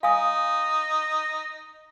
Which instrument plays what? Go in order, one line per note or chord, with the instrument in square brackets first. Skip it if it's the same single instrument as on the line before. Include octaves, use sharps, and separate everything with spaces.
[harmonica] D#4 [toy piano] F5 G#5 D#6